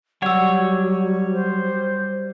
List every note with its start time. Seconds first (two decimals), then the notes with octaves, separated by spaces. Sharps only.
0.22 F#3 G3 C#5 F#5 E6
1.31 C5